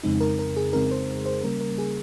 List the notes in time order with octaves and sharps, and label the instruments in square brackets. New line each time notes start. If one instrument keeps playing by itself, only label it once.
[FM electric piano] F2 C#3 G#3 C4 D#4
A#4
A#4
G#4
F2 C#3 G#3 C4 D#4 A#4
C5
C5
C#3 G3 A#3 C#4 A#4
A#4
G#4